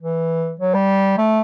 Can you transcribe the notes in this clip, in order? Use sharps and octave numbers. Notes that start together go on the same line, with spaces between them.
E3
F#3
G3
A3